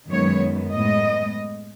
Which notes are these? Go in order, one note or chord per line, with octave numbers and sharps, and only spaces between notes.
F#2 D#3 G#3 B3 C#5
A2 G#3 B3 D#5